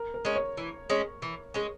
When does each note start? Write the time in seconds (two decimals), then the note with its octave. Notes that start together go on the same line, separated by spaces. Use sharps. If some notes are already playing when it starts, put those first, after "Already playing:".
Already playing: A#4
0.14 A#4
0.25 G#3 C#4
0.36 C#5
0.57 E3
0.90 G#3 C#4
1.22 E3
1.54 G#3 C#4